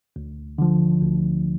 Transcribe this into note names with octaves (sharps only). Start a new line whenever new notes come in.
D2
D3 F3
D2